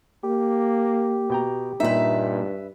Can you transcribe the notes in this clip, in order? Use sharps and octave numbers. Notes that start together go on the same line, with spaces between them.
A#3 G4
B2 G5 A#5
G2 A#2 D#4 B4 E5